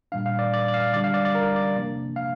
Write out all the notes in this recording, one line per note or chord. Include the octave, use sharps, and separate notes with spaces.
A#2 G3 D4 F5
F5
D5
D5
D5
F5
D3 G3 D4 D5
F5
D5
D5
A#4
D5
C3 F3 A#3 D4
F5